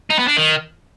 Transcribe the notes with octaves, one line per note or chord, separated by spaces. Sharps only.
D#4
B3
D4
D#3